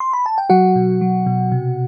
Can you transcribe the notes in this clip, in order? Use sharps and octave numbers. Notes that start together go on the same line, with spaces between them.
C6
B5
A5
G5
F#3 F#4 F#5
B2
F#3
B2
C3